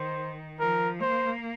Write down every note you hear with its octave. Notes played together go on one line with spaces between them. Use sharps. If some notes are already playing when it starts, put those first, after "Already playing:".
Already playing: D#3 C5
F3 A#4
A#3 C5